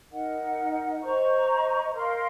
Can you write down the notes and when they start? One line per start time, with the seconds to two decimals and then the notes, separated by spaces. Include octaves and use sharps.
0.11 D#4 A#4 D#5 F#5
1.02 C5 D#5 A#5 C#6
1.94 A#4 F5 C6